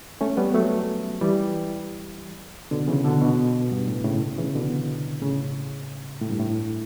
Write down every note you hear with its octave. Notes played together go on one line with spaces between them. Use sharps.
A3 C#4
G3 B3
F#3 A3
E3 G3
B2 D3
C#3 E3
B2 D3
B2
G2
A2
A2 C#3
C#3 E3
B2 D3
A2 C#3
A2
G2
A2